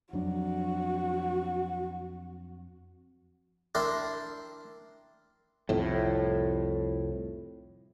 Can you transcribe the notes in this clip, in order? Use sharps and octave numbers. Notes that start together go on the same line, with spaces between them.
F2 F#3 D4 F#4
D4 E4 A#4 D5 G5 C6
C2 F2 A2